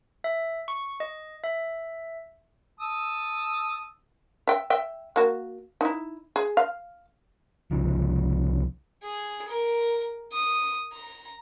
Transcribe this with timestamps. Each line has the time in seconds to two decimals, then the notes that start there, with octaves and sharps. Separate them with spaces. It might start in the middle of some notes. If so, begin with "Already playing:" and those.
0.24 E5
0.68 C#6
1.00 D#5
1.44 E5
2.80 A5 D#6 E6
4.47 E5 G5
4.70 E5 G5
5.16 A#3 F#4
5.81 D#4 E4
6.36 G#4
6.57 F5
7.71 C2 C#3 F3
9.03 G#4
9.48 A#4
10.32 D#6
10.93 A#5